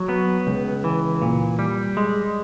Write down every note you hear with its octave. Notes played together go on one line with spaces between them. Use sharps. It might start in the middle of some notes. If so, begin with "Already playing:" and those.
Already playing: F#3
B3
C#2
E3
A#2
G3
G#3